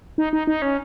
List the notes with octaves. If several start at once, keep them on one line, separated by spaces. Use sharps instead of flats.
D#4
D#4
D#4
C#4